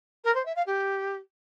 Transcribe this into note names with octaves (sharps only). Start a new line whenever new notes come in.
A#4
C5
E5
F5
G4